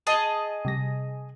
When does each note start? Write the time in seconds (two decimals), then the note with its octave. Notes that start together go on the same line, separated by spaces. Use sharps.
0.07 G#4 D#5 A5
0.65 C3 G3 A#6